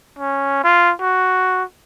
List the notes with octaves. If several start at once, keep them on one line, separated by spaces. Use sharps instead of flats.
C#4
F4
F#4